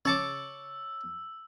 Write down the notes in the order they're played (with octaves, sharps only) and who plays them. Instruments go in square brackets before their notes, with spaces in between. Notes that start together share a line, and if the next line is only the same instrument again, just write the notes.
[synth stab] C#3 C#7 [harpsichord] C#5 A5 D6 [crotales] E6